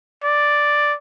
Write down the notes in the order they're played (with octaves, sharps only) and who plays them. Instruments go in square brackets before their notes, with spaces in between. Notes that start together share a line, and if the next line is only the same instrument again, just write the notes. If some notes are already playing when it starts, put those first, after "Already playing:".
[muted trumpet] D5